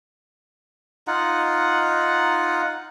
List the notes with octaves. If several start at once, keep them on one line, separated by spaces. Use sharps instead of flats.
D#4 F4 F#5